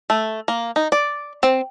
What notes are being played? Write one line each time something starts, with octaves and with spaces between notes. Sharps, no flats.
A3
A#3
D#4
D5
C4